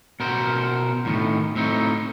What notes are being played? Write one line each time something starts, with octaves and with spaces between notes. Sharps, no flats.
B2 A#4 C5
E2 A2 D#3
A2 C4 D#4